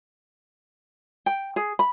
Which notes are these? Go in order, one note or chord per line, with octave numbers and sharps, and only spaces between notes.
G5
G#4
B5